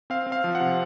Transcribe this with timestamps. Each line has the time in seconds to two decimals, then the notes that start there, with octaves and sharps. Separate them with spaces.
0.10 C4 F5
0.27 C4
0.32 F5
0.44 F3
0.55 F#5
0.60 C3